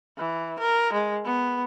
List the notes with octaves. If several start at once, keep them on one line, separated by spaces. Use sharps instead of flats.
E3
A#4
G#3
B3